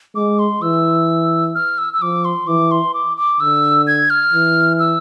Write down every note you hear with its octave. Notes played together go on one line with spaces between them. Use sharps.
G#3 D6
C6
E3 E6
F6
E6
E6
F3 D6
C6
E3 D6
C6
D6
D6
D3 E6
G#6
F6
E3
E6